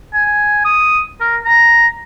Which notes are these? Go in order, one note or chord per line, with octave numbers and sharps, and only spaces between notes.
G#5
D#6
A#4
A#5